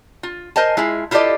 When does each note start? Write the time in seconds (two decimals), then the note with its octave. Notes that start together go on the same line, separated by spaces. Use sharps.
0.23 F4
0.56 A#4 C5 D#5 G#5 A5
0.77 G#3 E4 F4 G#4
1.11 E4 F4 G4 A4 D5 D#5